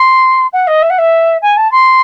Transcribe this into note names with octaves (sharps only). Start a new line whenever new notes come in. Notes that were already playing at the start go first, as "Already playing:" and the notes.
Already playing: C6
F#5
D#5
E5
F#5
E5
G#5
A5
C6